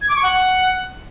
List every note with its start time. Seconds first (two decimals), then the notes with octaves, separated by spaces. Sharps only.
0.01 G#6
0.09 D6
0.16 C#6
0.23 F#5